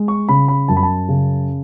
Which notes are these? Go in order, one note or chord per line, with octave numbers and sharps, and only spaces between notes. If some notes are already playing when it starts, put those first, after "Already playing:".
Already playing: G#3
C#6
C#3 B5
B5
F#2 A5
B5
A5
C#3